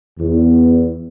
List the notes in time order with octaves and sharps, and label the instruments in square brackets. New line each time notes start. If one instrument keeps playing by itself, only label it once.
[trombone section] E2